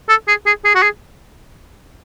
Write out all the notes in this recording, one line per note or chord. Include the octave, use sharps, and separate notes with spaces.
A4
G#4
G#4
G#4
F#4
G#4